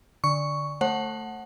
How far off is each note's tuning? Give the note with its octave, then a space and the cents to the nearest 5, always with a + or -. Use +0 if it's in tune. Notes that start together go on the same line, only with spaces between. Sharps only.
D3 +0 C#6 +5
A3 +5 C5 +45 F#5 +0